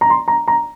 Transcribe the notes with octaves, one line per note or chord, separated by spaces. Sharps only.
A#5
C6
A#5
A#5